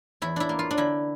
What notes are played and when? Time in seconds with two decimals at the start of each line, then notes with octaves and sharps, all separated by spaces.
0.22 E2 E4
0.36 D4 E4
0.49 A#3
0.59 F4
0.71 D4
0.77 D3 E4